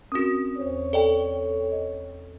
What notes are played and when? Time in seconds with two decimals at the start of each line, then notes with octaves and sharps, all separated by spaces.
0.12 C4 C#4 F#4 A#4 D#6
0.57 E2 C5 C#5
0.93 A4 D5 G5
1.72 D#5